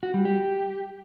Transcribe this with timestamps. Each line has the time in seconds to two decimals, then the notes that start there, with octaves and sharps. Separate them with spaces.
0.03 F#4
0.14 G3
0.25 G4